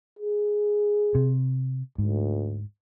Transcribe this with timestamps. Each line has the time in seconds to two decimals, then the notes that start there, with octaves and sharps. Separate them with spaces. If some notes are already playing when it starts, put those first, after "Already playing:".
0.19 G#4
1.15 C3
1.98 D2 G#2